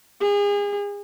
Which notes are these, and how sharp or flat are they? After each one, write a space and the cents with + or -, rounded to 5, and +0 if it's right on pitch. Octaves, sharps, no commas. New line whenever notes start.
G#4 -35